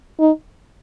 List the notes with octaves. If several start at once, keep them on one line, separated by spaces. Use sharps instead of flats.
D#4